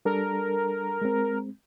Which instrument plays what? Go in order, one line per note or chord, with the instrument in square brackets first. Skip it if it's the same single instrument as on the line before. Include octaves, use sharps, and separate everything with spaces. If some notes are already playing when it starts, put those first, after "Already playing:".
[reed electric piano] G3 D4 A4 [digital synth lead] A#4
[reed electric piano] G#3 C4